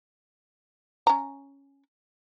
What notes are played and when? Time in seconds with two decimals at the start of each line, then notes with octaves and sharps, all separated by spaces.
1.07 C#4 A#5